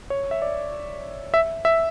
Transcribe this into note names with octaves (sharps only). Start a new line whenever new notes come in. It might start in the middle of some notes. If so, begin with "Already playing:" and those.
C#5
E5
D5
E5
E5